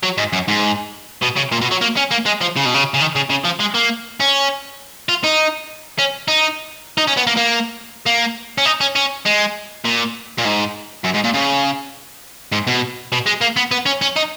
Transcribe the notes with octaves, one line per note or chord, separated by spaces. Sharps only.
F#3
G#2
F#2
G#2
B2
C#3
A#2
B2
F#3
A#3
C#4
A#3
G#3
F3
C#3
B2
C#3
C#3
D#3
C#3
C#3
F3
G#3
A#3
C#4
F4
D#4
C#4
D#4
D#4
C#4
B3
A#3
A#3
A#3
C#4
D#4
C#4
C#4
G#3
A#2
A#2
G#2
F#2
G#2
A#2
C#3
G#2
B2
B2
G#3
A#3
B3
B3
C#4
C#4
D#4